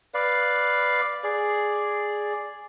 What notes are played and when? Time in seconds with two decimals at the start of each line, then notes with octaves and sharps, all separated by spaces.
0.14 B4 D5 F5
1.24 G#4 D5